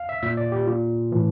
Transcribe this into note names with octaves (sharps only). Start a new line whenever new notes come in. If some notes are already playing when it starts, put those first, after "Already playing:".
Already playing: F5
E5
A#2 E5
D5
G4
A#2 F4
A2 E3